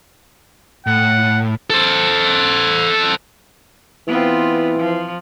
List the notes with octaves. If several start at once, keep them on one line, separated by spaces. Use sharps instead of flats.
A2 F#5
A4 C5
E3 B3 C4 F4
F3